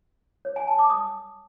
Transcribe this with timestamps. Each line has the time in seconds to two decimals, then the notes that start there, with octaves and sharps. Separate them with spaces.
0.45 C#5
0.56 G#5
0.67 A5
0.79 D6
0.90 D#6